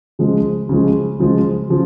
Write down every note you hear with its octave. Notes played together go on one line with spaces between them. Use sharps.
C#3 F3 G#3
C#3 F3 G#3
C#3 F3 G#3
C#3 F3